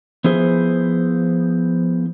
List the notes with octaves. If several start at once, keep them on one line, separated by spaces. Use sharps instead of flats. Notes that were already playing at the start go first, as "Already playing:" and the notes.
F3 B3 E4 G#4 C5